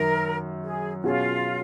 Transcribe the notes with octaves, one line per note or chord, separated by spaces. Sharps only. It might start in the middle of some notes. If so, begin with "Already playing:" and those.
Already playing: F#2 D#3 F#3 A#4
G#4
B2 F#3 C#4 F4 G#4